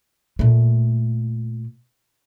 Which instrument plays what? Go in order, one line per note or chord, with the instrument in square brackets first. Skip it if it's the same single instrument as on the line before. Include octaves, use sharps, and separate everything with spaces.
[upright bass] A#2 A3